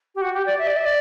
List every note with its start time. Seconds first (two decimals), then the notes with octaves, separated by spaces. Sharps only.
0.15 G4
0.21 F#4
0.34 G4
0.46 D5
0.58 E5
0.67 D5
0.76 E5
0.85 D5